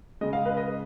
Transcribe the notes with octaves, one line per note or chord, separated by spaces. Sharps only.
C#3 G#3 D#5
F5
B4 D#5
B4 D#5